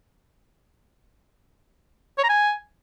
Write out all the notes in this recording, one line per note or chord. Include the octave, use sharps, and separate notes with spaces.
C#5
A#5
G#5